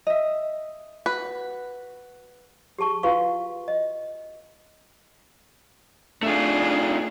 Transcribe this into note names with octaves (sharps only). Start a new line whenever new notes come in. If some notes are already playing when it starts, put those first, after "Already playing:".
D#5 E5
F#4 B4
G4 G#4 A5 C#6
F4 F#4 B4 F5 C#6
D#5
A3 D4 F4 G#4